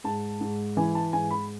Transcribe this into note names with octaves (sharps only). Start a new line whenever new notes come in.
G#2 A5
G#2
E3 G#5
A5
G#2 G#5
B5